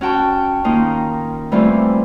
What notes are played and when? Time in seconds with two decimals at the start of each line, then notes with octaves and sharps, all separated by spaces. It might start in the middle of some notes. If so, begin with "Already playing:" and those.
0.01 C#4 F#4 G5 A5 C#6
0.64 D#3 A#3 C#4 D#4 F4
1.52 E3 G3 A3 C4 F4